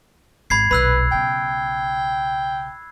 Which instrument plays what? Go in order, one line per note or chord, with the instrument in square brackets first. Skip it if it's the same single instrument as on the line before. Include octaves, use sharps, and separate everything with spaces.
[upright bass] G#1 [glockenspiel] B5 G#6 C7
[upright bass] D#1 B1 [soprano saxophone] B4 [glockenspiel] B5 E6 F#6
[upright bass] B1 C#3 [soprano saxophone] G5